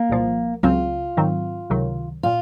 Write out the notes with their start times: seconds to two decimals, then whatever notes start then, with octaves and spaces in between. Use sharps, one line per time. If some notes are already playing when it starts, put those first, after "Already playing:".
Already playing: A#3
0.09 C2 A#2 F3
0.63 C#2 C#3 F#3 C4 F4
1.17 G#2 D#3 F#3 C4
1.70 C#2 C3 D#3 F#3
2.23 A#2 F4